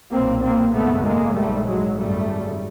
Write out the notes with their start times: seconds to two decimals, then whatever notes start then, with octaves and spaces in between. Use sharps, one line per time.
0.12 B1 A#2 A#3 C4
0.43 A#3 C4
0.75 G#1 F#2 C#3 A3 B3
1.05 G#3 A#3
1.36 A#1 G#2 G3 A3
1.67 F#3 G#3
1.98 G#1 F#2 C#3 G3 A3